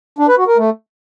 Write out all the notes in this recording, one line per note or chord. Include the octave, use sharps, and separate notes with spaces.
D4
B4
F#4
A#4
A3